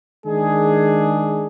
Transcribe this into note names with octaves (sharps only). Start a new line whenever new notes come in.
D#3 G#3 D4 G#4